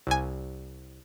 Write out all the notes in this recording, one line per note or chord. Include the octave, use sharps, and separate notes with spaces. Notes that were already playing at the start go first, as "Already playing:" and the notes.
C2 G#5